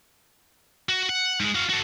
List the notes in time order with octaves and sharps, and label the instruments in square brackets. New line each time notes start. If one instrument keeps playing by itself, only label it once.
[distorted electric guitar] F#4
F#5
G#2 G#3
F#4 F5
F#4 A4